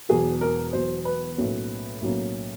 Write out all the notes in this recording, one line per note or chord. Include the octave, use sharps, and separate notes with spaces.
E1 E2 B2 F#3 G#4
A#4
E1 E2 B2 F#3 C5
B4
B1 A2 F#3 A#3 C#4
B1 A2 F#3 A#3 C#4